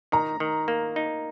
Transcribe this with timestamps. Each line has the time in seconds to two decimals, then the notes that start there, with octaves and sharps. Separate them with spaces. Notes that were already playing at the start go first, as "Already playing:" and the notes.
0.12 D#3 A#5
0.40 D#3
0.68 A#3
0.96 D#4